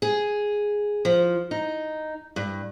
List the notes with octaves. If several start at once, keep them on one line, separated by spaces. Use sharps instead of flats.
G#4
F3
D#4
G2